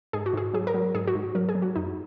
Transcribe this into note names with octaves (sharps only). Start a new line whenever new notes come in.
G#2 G#4
F#4
G#2 G#4
F#3 G#4
A#4
F#3
G#2 G#4
F#4
G#2
F#3 A#4
G#4
F#3
F#4
F#2 D#4